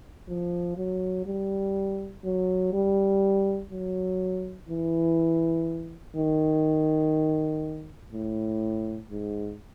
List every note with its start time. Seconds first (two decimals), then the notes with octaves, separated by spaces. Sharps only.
0.28 F3
0.77 F#3
1.26 G3
2.24 F#3
2.73 G3
3.71 F#3
4.69 E3
6.16 D#3
8.12 A2
9.10 G#2